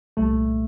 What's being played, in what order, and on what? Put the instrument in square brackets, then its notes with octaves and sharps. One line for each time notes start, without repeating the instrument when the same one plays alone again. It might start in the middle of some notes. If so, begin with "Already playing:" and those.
[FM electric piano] C2 A#2 G3 [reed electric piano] A3